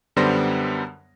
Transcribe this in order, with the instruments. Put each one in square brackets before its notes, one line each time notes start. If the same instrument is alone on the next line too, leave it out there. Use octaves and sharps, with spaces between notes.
[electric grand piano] F#2 D3 G3 B3 C5 A#6